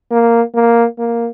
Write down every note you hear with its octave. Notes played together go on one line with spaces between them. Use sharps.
A#3
A#3
A#3